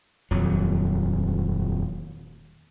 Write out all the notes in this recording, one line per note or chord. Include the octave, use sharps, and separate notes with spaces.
D#1 F2 F#3